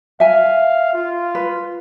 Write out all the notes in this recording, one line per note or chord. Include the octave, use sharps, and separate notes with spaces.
E5 F5 G#5
F4
B4